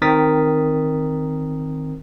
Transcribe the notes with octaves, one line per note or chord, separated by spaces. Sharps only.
D#3 C4 A#4 D#6 A6 B6